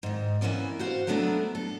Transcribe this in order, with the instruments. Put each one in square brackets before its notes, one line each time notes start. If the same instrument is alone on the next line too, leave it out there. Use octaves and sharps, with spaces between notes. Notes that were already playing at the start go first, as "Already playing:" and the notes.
[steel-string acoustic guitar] G#2 D#3
E3 A#3 B3 C#4 D5
F#4 C5 F5
F#3 A3 B3 D4 A4 A#4
A4